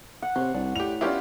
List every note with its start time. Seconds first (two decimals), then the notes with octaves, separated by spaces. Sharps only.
0.22 F#5
0.36 C3 C5 C#5
0.54 C2 D4
0.76 A2 G4 F7
1.01 B3 C#4 D4 E4 F4 G4